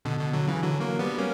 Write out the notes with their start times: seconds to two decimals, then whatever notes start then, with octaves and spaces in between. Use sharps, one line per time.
0.05 B2 D3
0.19 B2 D3
0.34 D3 F#3
0.47 C#3 E3
0.62 D3 F#3
0.80 F#3 A#3
0.99 G3 B3
1.18 A#3 C#4